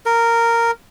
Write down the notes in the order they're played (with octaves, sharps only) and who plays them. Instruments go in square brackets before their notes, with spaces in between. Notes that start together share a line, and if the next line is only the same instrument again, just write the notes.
[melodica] A#4